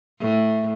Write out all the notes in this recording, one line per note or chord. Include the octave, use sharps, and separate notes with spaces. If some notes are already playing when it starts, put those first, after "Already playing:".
A2